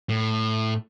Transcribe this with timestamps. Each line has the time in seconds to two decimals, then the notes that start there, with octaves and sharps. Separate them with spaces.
0.09 A2